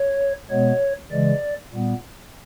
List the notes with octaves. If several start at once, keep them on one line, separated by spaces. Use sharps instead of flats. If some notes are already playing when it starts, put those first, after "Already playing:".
Already playing: C#5
B2 G#3 B3 C#5
C#3 E3 G#3 D5
A#2 G3 B3